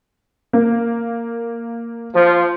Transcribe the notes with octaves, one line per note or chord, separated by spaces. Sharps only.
A#3
F3